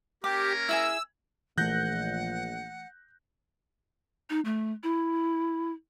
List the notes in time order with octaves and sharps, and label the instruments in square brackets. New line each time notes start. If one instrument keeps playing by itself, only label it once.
[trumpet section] A#3 C#4 A#4 [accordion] G4 [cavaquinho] D6
[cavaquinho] E4 G#4 G#5 [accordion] E6
[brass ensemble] A#1 [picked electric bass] E3 A3 [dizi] F#5 [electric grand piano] F#6 G6 A#6
[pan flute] D#4
A3
E4